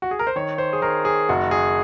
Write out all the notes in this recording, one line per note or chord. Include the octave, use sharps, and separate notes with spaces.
F#4
G#4
A#4
C5
D#3 C#5
C5
G#4
D#3 A#4
G#4
F#1 F#4
G#4